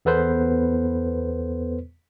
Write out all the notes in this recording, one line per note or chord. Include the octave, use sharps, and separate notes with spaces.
E2 B3 A4 B4 C5